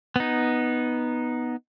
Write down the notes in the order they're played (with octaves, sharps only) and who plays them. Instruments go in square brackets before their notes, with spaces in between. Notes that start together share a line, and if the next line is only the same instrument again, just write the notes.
[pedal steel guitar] B3 D#4